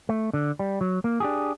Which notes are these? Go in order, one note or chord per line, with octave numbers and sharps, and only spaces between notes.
A3
D3
G3
F#3
A#3
D4 G4 G#4